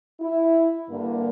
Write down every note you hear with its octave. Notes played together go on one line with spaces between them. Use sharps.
E4
G2 D3 A#3